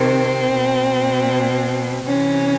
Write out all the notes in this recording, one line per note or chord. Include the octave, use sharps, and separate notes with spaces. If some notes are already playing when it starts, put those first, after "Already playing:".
Already playing: C3 D#3 C4
B2
C3 E3 C#4